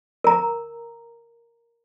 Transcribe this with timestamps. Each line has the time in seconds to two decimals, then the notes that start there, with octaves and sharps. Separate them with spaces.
0.24 A#4 A#5